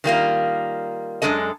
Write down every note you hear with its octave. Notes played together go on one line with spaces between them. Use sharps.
D#3 G3 A#3 F4
F#2 G#3 D4 A4 D#5